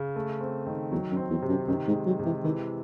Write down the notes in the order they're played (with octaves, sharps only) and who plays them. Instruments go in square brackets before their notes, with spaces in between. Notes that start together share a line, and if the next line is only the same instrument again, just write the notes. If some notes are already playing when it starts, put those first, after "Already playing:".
Already playing: [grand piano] C#3
A3
C4
D#3
[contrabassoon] E2 [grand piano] F#3
[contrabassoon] F#2
[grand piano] C4
[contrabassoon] E2
[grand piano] C3
[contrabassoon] F#2
[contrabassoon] F#2 [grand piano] D#3
[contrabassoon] G#2
[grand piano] G#3
[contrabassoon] F#3
[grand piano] C3
[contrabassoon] E3
[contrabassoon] D#3 [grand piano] E3